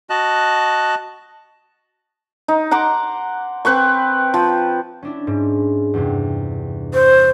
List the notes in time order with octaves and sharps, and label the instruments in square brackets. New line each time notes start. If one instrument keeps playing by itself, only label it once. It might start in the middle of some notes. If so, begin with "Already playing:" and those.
[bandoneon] F#4 D#5 A5 F#6
[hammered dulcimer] D#4
F#5 A#5 C6 D6
C4 B4 G5 C#6
F3
[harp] C#4 D4 E4
G#2
E2 G2 C3
[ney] C5 [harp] C#6 F#6